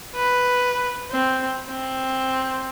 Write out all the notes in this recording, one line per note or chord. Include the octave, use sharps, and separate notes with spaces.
B4
C4
C4